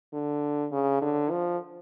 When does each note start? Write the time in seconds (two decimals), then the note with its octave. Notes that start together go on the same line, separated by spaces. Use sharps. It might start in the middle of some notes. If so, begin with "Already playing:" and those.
0.13 D3
0.72 C#3
1.02 D3
1.31 F3